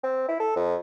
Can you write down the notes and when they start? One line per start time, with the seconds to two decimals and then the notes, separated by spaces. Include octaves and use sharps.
0.04 C4
0.28 E4
0.40 A4
0.56 F2